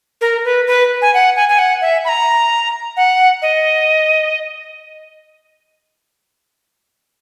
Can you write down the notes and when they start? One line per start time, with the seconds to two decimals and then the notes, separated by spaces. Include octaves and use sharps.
0.21 A#4
0.45 B4
0.67 B4
1.02 G#5
1.14 F#5
1.36 G#5
1.49 G#5
1.59 F#5
1.81 E5
2.05 B5
2.09 A#5
2.97 F#5
3.42 D#5